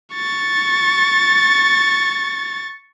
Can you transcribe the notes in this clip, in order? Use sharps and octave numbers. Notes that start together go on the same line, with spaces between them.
C#6 A6